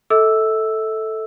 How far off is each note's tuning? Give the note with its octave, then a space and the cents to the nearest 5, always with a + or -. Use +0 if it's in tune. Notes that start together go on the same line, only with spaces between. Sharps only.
A4 +0 E5 -45 E6 +0